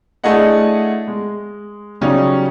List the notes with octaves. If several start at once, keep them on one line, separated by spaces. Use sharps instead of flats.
A3 D4 E4 G#4 D#5 F#5
G#3
C#3 F#3 G3 C#4 D#4